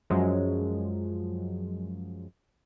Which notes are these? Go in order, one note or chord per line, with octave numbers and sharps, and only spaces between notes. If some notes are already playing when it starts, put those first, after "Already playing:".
F#2 F3 F#3 G#3